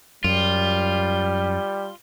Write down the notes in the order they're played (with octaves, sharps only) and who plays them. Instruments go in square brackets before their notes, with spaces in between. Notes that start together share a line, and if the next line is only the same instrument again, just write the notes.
[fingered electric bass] F#2 [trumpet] G3 [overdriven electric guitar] F4